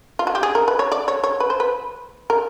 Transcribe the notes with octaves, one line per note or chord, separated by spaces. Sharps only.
F4
F#4
G4
G#4
A#4
B4
C#5
D5
C#5
C#5
B4
C5
B4
A#4